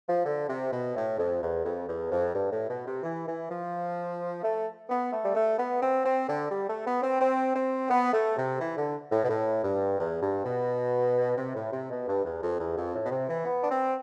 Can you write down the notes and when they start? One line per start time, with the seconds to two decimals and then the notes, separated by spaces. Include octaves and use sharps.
0.09 F3
0.25 D3
0.48 C3
0.72 B2
0.95 A2
1.18 F2
1.42 E2
1.64 F2
1.87 E2
2.11 F2
2.34 G2
2.51 A2
2.69 B2
2.86 C3
3.03 E3
3.27 E3
3.50 F3
4.43 A3
4.89 B3
5.12 A3
5.24 G3
5.35 A3
5.58 B3
5.82 C4
6.04 C4
6.28 D3
6.50 G3
6.68 A3
6.86 B3
7.02 C4
7.20 C4
7.55 C4
7.89 B3
8.13 A3
8.37 C3
8.60 E3
8.77 D3
9.11 A2
9.23 B2
9.28 A2
9.63 G2
9.99 E2
10.21 G2
10.44 B2
11.37 C3
11.55 A2
11.72 C3
11.89 B2
12.07 G2
12.24 E2
12.42 F2
12.59 E2
12.76 F2
12.94 A2
13.05 B2
13.11 C3
13.28 E3
13.45 B3
13.62 D4
13.69 C4